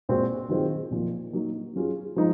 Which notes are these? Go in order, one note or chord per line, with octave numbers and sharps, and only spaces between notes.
A#2 G#3 C4 F#4
D#3 F#3 C4 F4 G#4
A#2 F3 A#3
F#3 A#3 D#4
F#3 C#4 F4 G#4
F3 G#3 D#4